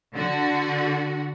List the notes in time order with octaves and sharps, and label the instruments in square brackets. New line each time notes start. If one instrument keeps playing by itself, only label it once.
[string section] D3 F#4